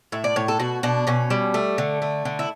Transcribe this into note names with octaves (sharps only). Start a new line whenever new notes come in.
A2 E5
D5
A2 C#5
A4
B2 F#4
B2 D4
B2 C#4
G3
A3
D3
A3
D3
E4